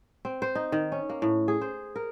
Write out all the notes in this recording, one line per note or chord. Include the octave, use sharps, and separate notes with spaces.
C4
C5
D#4
D#3
C#4
A#3
A2
G#4
C5
A#4